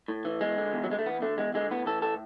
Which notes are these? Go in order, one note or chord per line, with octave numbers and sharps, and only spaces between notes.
A2
E3
E2 G#3
D3
E2
F#3
D3 G#3
A3
E2 B3
D3 A3
E2 G#3
D3 G#3
A2 B3
E3 A4
A2 A4